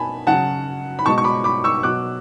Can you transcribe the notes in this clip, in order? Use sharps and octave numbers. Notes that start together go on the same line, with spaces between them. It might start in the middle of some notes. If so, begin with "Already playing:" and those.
Already playing: B2 G#5 A5 B5
C#3 F#3 F#5 A5
B5
B2 G#3 A5 C#6
C#6
B5 D6
B5 D6
C#6 E6
B2 F#3 D6 F#6